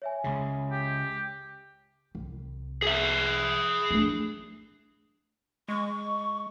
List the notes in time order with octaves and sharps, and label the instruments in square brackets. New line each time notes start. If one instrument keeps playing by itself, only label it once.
[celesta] C#5 E5 G#5
[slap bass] C#2 C#3
[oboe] G4
[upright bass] C2
[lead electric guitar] G#4 E5
[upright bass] A3 D4
[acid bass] G#3 [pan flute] C#6